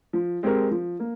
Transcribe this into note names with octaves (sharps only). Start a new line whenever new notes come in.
F3
G#3 C4 G4 A#4
F3
A#3